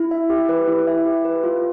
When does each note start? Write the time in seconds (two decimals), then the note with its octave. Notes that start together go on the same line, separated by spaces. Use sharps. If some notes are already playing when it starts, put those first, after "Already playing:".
Already playing: E4
0.11 E5
0.30 G4
0.49 B4
0.68 E4
0.87 E5
1.05 G4
1.25 B4
1.44 F4